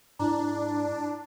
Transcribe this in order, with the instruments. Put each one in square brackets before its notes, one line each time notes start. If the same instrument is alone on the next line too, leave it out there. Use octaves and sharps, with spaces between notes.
[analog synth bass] G#2 [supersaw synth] D4 [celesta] E4 A#5